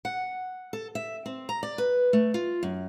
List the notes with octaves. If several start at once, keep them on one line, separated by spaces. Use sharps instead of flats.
F#5
A4
E5
C4
A#5
D5
B4
A3
F4
F#2